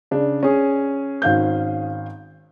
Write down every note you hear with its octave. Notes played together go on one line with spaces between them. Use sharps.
C#3 D4
C#4 G#4
G#1 F5 G6